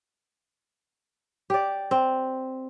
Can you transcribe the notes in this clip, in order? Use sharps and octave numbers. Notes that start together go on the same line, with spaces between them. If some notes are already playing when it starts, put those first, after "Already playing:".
G4 D5
C4